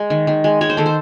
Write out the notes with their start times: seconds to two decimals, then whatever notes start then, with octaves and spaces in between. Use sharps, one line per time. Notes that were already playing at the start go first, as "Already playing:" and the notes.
Already playing: G#3
0.10 D#3
0.27 D#3
0.44 G#3
0.61 G#3 C#5
0.70 C5
0.77 D#3 A4
0.86 C5